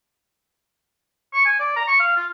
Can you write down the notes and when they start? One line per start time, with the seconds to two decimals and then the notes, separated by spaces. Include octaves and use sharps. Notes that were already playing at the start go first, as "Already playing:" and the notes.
1.34 C#6
1.45 G#5
1.60 D5
1.76 A#5
1.88 C#6
2.00 F5
2.17 F4